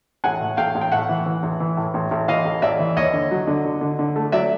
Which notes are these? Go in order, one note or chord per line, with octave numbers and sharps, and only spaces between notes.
A1 F#5 G#5
A2
A1 F5 G5
A1
G5
A2 E5 F#5
E3
E3
A1
E3
A2
A1
A1
E3 D#5 F5
A1
A1 D5 E5
E3
D#2 C#5 D#5
D3
F#3
D3
D3
D3
D3
A3
F#3 D5 E5